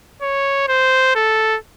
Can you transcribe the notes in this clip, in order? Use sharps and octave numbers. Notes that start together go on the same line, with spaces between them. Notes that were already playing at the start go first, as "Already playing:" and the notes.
C#5
C5
A4